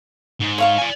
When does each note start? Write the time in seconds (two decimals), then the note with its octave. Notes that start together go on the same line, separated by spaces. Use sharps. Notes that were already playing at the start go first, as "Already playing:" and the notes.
0.40 G#2
0.58 C#5 F5 C#6
0.78 D5 G#5